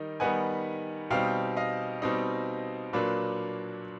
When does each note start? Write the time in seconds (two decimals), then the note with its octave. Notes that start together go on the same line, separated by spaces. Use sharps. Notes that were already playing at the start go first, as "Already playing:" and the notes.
Already playing: D#3 G3 D#4
0.20 D#3 G3 B3 D#4 F#5 G#5
1.11 B2 G3 C4 D#4 F5 G5
1.57 D#5 F5
2.02 B2 G3 C4 D#4
2.93 A#2 F#3 A#3 D4 B4